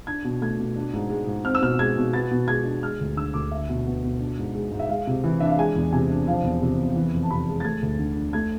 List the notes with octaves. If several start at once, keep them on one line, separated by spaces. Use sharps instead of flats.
D4 G#6
B2
A3 G#6
B2
D4
G#2
G#3
G#2
C4 F6
E6
B2 F6
G#3 G#6
B2
B3 A6
B2
G#3 G#6
D4
G#3 F6
D2
D3 E6
D2 D6
D4 E5
B2
B3
B2
D4
G#2
G#3
G#2
E5
G#3 F5
C3
E3
D4 E5
F5
G#3 G#5
E2
C3 G#5
D4
F3 F5
E2
C3
E2
E3
F2
A5
C3 B5
G#3
A6
A3 G#6
D2
D3
D4
A3 G#6